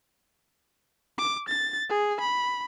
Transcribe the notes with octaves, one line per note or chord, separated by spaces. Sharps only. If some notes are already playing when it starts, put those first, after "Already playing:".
D6
A6
G#4
B5